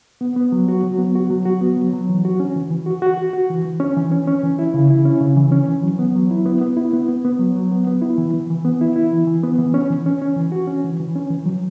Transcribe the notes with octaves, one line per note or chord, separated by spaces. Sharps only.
B3
B3
F#3
F#4
F#3
B3
F#4
F#3
F#4
B3
F#3
F#3
E3
F#4
C#4
E3
E3
F#4
F#4
F#4
F#4
E3
E3
C#4
E3
C#4
C#4
E3
E4
C#3
E4
C#4
C#3
E3
C#4
E3
F#3
B3
F#3
E4
B3
B3
E4
B3
B3
B3
F#3
F#3
B3
B3
E4
E3
E3
E3
B3
E4
E4
E3
E3
B3
E3
C#4
E3
C#4
C#4
E3
F#4
C#4
E3
E3
C#4
E3
F#3